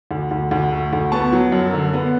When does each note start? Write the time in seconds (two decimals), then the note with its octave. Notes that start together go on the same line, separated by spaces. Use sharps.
0.11 D2
0.31 D2
0.51 D2
0.72 A3
0.93 D2
1.12 B3 A5 C#6
1.32 F#3
1.52 F#2
1.74 D3
1.94 B3